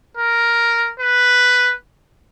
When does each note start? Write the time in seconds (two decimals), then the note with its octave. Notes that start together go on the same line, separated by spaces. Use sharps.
0.17 A#4
1.00 B4